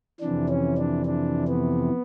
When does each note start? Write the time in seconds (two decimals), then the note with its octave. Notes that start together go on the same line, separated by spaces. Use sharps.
0.20 F2 C3 E3 D4
0.49 C#4
0.77 D4
1.05 D4
1.48 B3